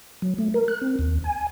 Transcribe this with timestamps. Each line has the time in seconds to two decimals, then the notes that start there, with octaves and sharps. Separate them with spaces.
0.22 F#3
0.38 A3
0.54 A#4
0.68 F#6
0.81 C4
0.99 D#2
1.24 G#5